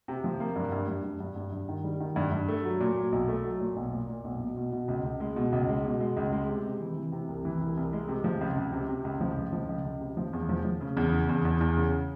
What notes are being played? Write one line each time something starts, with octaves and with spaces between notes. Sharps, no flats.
C3
F3
A#3
G2
G2
G2
G2
G2
G2
G2
D#3
G3
D#3
G2
G2
A3
F#3
A#2
F#3
B1
A3
F#3
A#2
B1
A#2
A#2
B1
B2
B2
B2
C#2
C#2
G#3
B2
C#2
G#3
B2
G#3
C#2
G#3
C3
C3
E3
E3
C3
C2
E3
C2
C2
G#3
C3
F3
C#2
C#2
C3
C3
C#2
F3
C#2
F3
C#2
C#2
C3
F3
E2
F3
F3
C#3
E2
C#3
E2
E2
E2
C#3